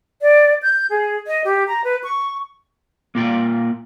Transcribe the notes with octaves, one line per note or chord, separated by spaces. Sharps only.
D5
G6
G#4
D#5
G4
A#5
B4
C#6
A#3 F4 G5